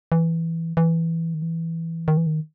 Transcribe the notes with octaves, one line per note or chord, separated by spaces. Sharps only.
E3
E3
D#3
E3
D#3
E3
D#3